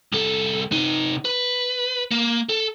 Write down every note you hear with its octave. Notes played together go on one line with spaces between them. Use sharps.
C2 A4
C3 D#4
B4
A#3
A4